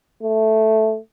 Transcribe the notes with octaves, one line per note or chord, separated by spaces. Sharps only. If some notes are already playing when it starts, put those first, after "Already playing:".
A3